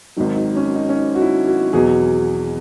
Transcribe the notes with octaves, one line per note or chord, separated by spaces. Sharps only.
G#1 G#2 D#3 F#3 D#4
D#4
C#4
D#4
C#4
D#4
F#4
E4
F#4
E2 B2 F#3 G#4